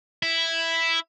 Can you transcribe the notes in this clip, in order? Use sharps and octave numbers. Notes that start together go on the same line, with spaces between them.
E4